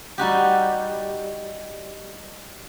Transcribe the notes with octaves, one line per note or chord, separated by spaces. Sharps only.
G3 D#4 F#4 G4